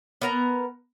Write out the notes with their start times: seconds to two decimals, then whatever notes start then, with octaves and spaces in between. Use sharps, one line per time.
0.22 B3 A#4 A#5